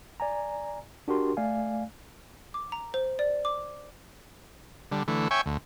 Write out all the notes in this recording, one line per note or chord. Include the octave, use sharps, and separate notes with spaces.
D5 G#5 A#5
D4 F#4 G4 A#4 C6
A3 D5 F5 G#5
D6
A#5
C5
D5
D6
D3 G3
D3 E3 A3
C#5 E5 G5 G#5 C#6
D2